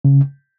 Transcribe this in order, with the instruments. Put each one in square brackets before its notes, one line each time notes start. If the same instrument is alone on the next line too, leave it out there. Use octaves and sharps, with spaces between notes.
[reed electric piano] C#3